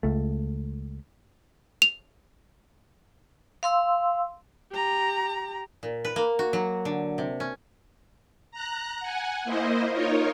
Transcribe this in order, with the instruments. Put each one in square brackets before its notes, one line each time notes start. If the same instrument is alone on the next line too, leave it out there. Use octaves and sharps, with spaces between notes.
[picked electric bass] C#2 A3
[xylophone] F7
[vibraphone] F5 C6 E6
[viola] G4 A#5
[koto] A#2
B4
A#3
F#4
F#3
D3
C3
C#4
[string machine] A#5 F#6
F#5 G#5
A#3 E4 C5 D#5
D#4 F4 A#4 C#5